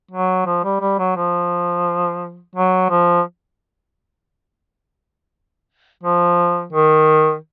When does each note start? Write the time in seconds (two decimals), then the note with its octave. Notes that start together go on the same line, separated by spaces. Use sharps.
0.11 F#3
0.46 F3
0.64 G3
0.80 G3
0.99 F#3
1.16 F3
2.55 F#3
2.90 F3
6.03 F3
6.73 D#3